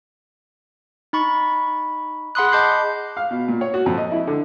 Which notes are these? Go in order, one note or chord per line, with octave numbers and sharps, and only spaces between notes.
D#4 B5 C#6
G#4 F#5 B5 C6 D#6 F#6
D#5 A5 D6 G6 C7
F5
B2
A#2
C#5
F#4
F2
D#5
E4
D3